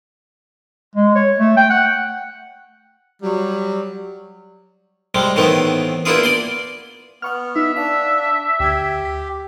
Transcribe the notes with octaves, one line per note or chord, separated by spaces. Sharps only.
G#3
C#5
A3
G5
F#5
F#3 G3
C3 G3 G#3
A2 D#3 E3 B3 C4
A#3 B3 D4 E4 F4 G#4
D5 G#5 C6
B3 F#5 C#6 F6
D#4 E5
D4 F5
D2 G4 G#6
B6